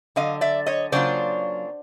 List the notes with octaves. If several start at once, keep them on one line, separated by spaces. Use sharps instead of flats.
D3 F#3 D#5 F5
D5 E5
C#5 D#5
C#3 F#3 A#3 D4 F4 C5 D5